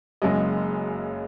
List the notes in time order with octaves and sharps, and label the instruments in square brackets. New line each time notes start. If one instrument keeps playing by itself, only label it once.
[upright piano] F#1 F#2 C#3 G#3 D#5